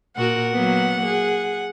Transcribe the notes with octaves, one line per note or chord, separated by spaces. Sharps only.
A#2 F#4 A#4 F#5
F#3 A#3 B3
G#4